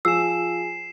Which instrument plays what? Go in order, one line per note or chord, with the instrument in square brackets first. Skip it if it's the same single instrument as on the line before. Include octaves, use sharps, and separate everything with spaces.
[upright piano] F3 [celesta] G#4 G#5 [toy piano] E6 [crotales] C7 E7